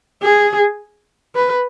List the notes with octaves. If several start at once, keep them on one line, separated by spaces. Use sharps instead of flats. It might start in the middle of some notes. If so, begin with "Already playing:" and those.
G#4
B4